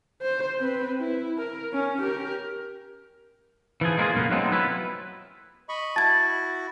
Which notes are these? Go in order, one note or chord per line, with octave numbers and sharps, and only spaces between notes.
C5
C4 B4
E4
A#4
C#4
G4 A#4
E3 F3 G#4
G#3 A#3 B3 E4 F4 G#4
B1 F#2 A#3 B3
F#3 G#3 A3 B3 C4 D#4
F#3 B3 E4 F4 B4
D#5 B5 C#6
E4 F#4 A5 G#6 A6